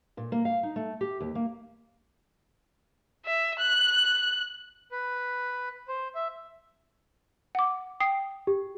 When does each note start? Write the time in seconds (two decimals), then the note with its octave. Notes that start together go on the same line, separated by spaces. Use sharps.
0.17 A#2
0.32 A#3
0.45 F5
0.63 D#4
0.76 A3
1.01 G4
1.20 D#2
1.35 A#3
3.26 E5
3.59 F#6
4.91 B4
5.88 C5
6.15 E5
7.55 F#5 D6
8.00 G5 D#6 C7
8.47 G4